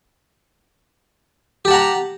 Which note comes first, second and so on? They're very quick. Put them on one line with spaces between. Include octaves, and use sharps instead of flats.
G4 A5 F#5 A#5